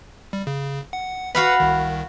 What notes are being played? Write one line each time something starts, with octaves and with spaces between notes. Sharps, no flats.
G3
C#3
F#5
F#4 B4 F5 F#5 B5
C2 D#3